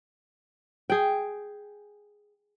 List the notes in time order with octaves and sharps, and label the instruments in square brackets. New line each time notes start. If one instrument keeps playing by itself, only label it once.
[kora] G#4 G5